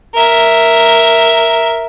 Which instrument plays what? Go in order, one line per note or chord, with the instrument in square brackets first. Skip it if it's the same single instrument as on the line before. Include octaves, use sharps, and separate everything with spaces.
[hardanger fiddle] A#4 E5